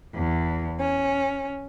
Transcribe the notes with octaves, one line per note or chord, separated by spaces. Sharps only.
E2
C#4